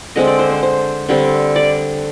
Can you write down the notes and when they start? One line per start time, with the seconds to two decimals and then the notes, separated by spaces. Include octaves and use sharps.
0.16 D3 G#3 C4 D#5
0.27 D5
0.39 C5
0.50 C5
0.63 C5
1.09 D3 G3 C4
1.56 D5